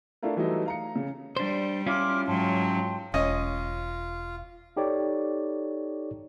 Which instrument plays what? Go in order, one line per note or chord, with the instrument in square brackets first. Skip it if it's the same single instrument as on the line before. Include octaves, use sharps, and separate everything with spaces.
[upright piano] A3 D4 E4 F4 A#4
E3 F#3 G3 A3 D#4 E4
F5 A#5 C#7
C#3
[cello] G3 [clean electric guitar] D4 C5
[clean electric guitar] C#4 E4 F4 [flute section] C6 D6 F6
[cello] G#2 F#3 [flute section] G5 A5 C6
[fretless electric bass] E1 [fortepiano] C#4 D#5 [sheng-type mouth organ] F4
[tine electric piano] D#4 G4 A4 C#5 D5